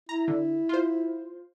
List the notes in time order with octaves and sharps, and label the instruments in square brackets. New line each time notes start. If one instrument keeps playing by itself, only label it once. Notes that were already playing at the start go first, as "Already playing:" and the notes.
[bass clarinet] E4 [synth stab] A#5
[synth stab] D3
F4 C5